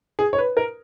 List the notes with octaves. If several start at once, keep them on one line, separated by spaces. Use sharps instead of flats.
G#4
C#5
B4
A#4